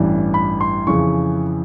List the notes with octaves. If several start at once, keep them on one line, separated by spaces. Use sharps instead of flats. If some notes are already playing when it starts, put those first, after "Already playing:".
Already playing: A1 G2 E3 G3
B5
C6
F2 C#3 E3 C#6